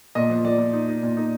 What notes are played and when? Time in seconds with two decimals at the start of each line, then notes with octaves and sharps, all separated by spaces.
0.15 A#2 D#5
0.30 F3
0.45 F3 D5
0.58 F3
0.73 D#4
0.88 D#4
1.03 A#2
1.17 D#4